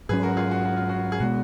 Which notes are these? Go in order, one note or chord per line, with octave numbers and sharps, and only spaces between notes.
G#2 F#3 C#4 G#4 B4
F#4 A#4
F4 G#4
F#4
F#4
F4
F#4
G#4
B2 G#3 B3 F#4